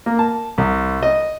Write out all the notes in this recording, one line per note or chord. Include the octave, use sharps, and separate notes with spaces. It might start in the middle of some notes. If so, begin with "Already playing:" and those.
A#3
A5
C2
D#5